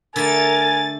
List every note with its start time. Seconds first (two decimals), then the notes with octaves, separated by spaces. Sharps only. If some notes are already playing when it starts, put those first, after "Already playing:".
0.16 D3 A3 A#4 G#5 A6